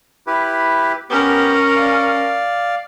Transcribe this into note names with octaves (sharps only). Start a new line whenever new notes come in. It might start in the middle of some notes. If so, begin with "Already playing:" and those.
E4 G4 B4
B3 C#4 G4 A#4
D5 F5